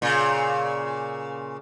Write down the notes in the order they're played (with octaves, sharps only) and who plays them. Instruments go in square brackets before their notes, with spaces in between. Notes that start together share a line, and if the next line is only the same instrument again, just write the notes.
[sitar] A#2 C#3